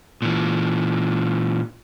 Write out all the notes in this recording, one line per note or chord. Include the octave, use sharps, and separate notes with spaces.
A#2 E3